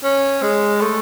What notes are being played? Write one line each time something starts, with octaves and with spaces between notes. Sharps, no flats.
C#4
G#3
A3